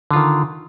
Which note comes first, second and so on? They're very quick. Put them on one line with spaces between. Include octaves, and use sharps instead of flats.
D3 F4 D#3